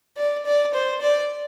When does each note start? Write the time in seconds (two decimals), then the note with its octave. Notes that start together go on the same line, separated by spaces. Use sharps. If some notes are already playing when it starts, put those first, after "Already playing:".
0.17 D5
0.46 D5
0.74 C5
1.01 D5